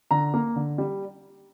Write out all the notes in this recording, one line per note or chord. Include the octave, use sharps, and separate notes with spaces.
D3 A#5
A#3
D3
G3